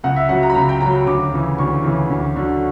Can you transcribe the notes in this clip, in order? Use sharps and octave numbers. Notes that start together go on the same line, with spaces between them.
C#2 F#5
E5
C#3 F#3 F#5
A#5
B5
C#2 A#5
G5
C#3 F#3 A#5
D2 D6
C#3 E3
D2 C#6
C#3 E3
D2
D3 F#3